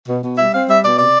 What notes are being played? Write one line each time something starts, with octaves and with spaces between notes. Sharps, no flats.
B2
B2
G3 E5
C4 F5
G3 E5
B2 D5
C3 D5